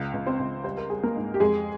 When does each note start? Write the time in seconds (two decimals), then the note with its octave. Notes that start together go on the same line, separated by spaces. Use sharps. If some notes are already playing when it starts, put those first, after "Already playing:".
Already playing: C#2
0.13 C#2
0.26 C4 C5
0.39 C#2
0.64 G3 C5
0.77 A#4
0.90 G3 G#4
1.03 A#3 A#4
1.16 G#2
1.34 G4
1.40 F2 G#3 G#4